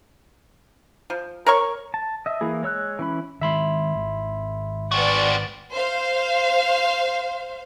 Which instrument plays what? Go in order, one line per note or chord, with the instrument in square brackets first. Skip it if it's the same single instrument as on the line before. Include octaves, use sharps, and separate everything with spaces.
[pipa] F3
A#4 C#5 C#6
[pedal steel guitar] A5
D#5 E5
E3 A#3 E4 G#4
G#3 C#5 E6 F#6
E3 C#4 B5
[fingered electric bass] D#3 G#3 [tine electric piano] E5 B5 C6
[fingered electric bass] G#1
[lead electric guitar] C4 F#4 [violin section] B4 D5 F#5
[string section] C5 F5